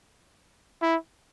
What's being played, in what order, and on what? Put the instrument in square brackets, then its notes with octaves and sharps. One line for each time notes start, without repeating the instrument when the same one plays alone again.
[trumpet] E4